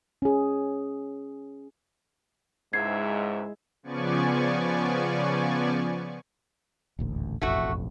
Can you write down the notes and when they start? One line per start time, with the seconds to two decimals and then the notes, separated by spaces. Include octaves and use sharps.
0.22 C#4 G#4
2.73 C#2 G#2 G#3 E4 E5 G#6 C7
3.83 C#3 F3 B3 D5 G#5 C#6
6.99 D#1 A1 D2
7.42 E1 A1 F2 A3 F#4